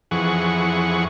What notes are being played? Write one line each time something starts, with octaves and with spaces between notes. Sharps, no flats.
F2 E3 G#4 F#5 C#6